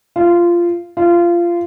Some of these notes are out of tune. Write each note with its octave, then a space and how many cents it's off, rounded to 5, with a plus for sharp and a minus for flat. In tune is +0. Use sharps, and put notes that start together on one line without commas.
F4 -15
F4 -20